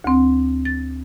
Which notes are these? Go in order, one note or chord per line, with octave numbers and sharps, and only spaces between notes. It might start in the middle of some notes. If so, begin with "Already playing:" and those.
D2 C4
A6